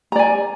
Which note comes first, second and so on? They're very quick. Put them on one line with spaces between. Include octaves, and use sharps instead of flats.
A#5 D5 G#5